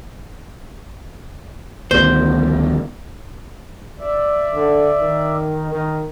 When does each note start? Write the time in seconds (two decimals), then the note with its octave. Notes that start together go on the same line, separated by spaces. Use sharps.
1.91 D2 B2 D#3 C5
4.00 D5 E5
4.54 D3
4.99 D#3
5.71 D#3